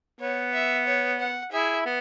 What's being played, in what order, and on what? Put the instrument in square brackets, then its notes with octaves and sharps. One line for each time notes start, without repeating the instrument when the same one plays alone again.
[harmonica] B3 [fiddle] C#5
[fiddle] E5
C#5
F#5
[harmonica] E4 G#4 [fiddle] E5
[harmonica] B3